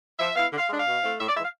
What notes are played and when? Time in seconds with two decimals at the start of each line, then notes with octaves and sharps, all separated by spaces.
0.19 F3 E5
0.35 B3 E4 F5
0.52 D3
0.58 F5
0.69 G#3 D4
0.79 F5
0.86 B2
1.02 A3 C4 E4
1.19 A2 E5
1.28 D5
1.35 E3 G#3 E5
1.44 F5